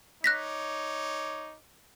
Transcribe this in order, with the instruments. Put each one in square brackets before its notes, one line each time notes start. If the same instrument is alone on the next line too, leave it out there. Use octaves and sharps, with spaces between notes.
[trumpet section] D#4 C#5 D6 [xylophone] F#6 A#6 B6